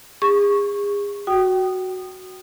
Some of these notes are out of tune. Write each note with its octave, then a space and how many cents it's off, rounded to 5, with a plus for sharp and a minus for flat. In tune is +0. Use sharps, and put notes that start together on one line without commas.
G#4 -35 C#6 +0
F#4 +0 G5 -25 D#6 -15